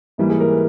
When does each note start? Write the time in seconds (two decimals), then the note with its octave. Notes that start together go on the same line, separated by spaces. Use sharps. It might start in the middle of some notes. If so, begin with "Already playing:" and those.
0.18 G#2 E3 G3 A#3 E4
0.30 G#4
0.40 A#4
0.53 B4